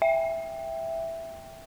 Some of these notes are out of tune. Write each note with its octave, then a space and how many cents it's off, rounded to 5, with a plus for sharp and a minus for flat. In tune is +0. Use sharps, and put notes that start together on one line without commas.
E5 +0 G5 +10